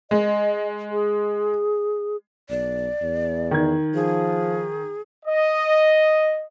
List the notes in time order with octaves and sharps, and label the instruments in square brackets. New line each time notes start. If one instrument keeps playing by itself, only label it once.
[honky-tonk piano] G#3 [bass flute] D#5
[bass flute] G#4
[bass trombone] B1 [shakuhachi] D5
[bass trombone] E2
[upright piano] D#3 G#6
[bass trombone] F3 [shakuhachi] G#4
[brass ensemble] D#5